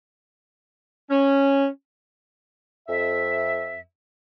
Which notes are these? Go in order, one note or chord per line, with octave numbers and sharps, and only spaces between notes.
C#4
F2 E5